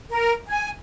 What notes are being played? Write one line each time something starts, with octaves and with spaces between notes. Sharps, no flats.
A#4
G#5